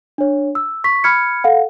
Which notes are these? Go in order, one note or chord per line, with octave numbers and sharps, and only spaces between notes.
D4 C#5
E6
C#6 B6
B5 F6 G#6 C#7
A4 F5 F#5